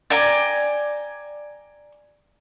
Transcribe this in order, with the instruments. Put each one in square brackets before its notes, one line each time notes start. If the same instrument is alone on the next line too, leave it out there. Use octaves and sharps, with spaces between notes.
[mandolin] D5 G5 G#5 A#5